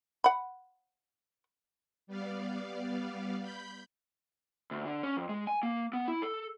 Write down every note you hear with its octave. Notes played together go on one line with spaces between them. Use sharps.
F#5 B5
G3 B3 D5 F5
B5 G6
D2
D3
C#4
F2
G#3
G#5
A#3
B3
E4
A4